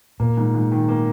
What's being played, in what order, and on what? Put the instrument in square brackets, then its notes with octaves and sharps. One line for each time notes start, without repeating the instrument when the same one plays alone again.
[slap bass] A#2 [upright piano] A#3
[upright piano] G#2
G#2
D#3
A#3